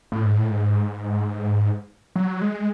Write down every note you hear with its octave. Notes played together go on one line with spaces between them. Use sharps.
A2
G#2
A2
G#2
F#3
G#3